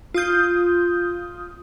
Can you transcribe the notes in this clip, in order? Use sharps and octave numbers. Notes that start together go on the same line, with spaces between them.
F4 D#6 G6